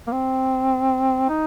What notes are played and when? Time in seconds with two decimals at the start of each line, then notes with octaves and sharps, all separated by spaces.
0.07 A#3
0.12 C4
1.29 D#4